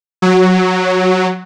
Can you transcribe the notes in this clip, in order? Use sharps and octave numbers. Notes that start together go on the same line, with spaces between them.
F#3